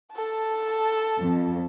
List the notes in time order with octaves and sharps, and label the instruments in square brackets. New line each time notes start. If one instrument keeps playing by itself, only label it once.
[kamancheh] A4 A5
[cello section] F2